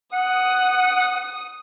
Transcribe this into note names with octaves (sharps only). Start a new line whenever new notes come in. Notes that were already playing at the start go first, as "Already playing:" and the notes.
F#5 D#6